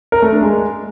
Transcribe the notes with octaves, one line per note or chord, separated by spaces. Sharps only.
A#4
A3
D4
G#3